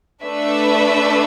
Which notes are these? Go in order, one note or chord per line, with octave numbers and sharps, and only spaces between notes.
A3 D4 B4 E5